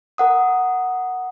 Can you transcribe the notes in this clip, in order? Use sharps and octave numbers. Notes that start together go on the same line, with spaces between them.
A#4 F#5 D#6